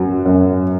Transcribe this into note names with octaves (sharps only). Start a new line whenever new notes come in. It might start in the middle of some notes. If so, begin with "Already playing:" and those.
Already playing: F#2 F#3
F#2